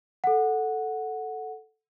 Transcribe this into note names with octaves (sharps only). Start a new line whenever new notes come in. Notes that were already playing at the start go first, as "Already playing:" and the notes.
A4 F#5